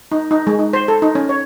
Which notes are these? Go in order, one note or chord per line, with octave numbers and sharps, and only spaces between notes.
D#4
D#4
G#3
D#4
C5
A4
D#4
C#4
C#5